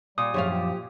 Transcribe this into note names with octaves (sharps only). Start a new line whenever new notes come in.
A#2 G3 D#6
F#2 F3 G4 G#4 C#5 F5
G4